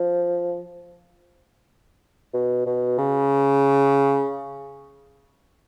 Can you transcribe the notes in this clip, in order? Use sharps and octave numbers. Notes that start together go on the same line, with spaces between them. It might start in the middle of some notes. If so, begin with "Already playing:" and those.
Already playing: F3
B2
B2
C#3